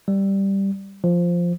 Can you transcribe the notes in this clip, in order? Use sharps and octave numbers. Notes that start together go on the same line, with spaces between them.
G3
F3